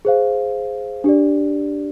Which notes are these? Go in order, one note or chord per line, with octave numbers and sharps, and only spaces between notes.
G#4 C5 F5
D4 G4 D5